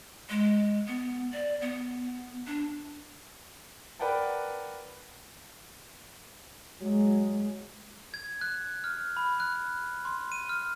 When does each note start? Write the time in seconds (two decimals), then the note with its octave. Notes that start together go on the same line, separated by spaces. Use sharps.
0.30 G#3
0.87 B3
1.33 D5
1.61 B3
2.47 D4
3.99 A#4 B4 D5 F#5 G5 A5
6.81 F#3 G#3
8.14 G#6
8.41 F#6
8.84 F6
9.17 B5
9.40 F#6
10.05 C6
10.32 D#7
10.49 F6